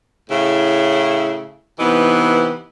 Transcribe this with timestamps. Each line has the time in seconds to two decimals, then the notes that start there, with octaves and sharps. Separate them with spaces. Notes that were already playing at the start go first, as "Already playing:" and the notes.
0.30 A2 C#3 E4
1.79 C3 E3 B3 D#4